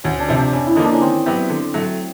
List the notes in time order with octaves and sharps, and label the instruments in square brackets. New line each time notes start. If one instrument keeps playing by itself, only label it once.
[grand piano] D2 [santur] C#4
[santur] D4
[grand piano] C3 F3
[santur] D4
[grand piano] F2 [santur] C#4
[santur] E4
[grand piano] D3 F3 A#3 [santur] D#4
[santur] D4
C#4
[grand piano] D#3 [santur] C4
[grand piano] F#3 B3 E4 G4
D3
F#3 A3